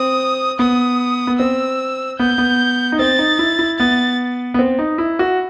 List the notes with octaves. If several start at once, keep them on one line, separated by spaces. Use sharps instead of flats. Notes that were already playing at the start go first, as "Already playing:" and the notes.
Already playing: C4 D#6
B3 D#6
B3
C4 E6
B3 G6
B3
D#4
C4 A6
D#4
E4
E4
B3 A6
B3
C4
D#4
E4
F#4